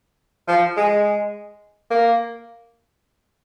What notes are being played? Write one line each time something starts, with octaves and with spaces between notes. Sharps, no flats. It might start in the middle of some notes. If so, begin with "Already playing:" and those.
F3
G#3
A#3